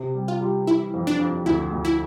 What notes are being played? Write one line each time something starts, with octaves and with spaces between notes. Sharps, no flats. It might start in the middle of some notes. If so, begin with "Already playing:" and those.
Already playing: C3
G3
F4
G3
E3 E4
F2
D4
F2
D2 E4
D2
E4